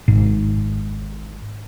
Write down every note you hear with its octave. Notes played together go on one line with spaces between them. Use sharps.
G#1 G#2